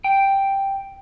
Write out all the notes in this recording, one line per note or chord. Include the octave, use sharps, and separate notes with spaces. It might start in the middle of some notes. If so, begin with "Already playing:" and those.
G5